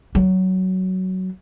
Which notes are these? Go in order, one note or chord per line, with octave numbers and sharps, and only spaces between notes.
F#3